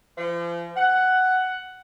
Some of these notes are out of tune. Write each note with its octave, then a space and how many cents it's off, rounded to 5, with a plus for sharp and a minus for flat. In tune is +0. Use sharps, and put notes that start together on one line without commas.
F3 -40
F#5 +10